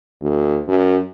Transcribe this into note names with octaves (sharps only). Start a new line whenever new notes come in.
D2
F#2